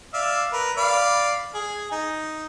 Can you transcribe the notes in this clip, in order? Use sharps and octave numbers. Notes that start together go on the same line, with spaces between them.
D5 E5 F5
A#4 B4
D5 F5 B5
G#4
D#4